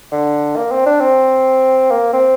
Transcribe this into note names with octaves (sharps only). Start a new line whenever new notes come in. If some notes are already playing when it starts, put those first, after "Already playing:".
D3
A#3
C4
D4
C4
A#3
C4